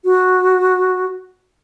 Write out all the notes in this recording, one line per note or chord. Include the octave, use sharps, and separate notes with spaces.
F#4